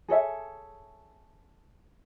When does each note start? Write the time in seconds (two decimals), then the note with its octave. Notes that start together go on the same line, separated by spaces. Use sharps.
0.08 G#4 A4 C#5 E5